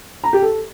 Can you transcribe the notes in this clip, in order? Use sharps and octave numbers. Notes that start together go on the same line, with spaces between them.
A#5
G4
A4